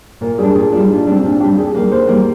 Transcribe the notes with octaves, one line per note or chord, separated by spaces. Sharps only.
A#2 A#4
G3 D4 G#4
A#2 G#4
G3 D4 F4
D#4
A#2 D4
G3 D4
C4
A#2 D4
G3 D4 G4
D#2 G#4
D#3 G3 A#3 A#4
D#2 C5
D#3 G3 A#3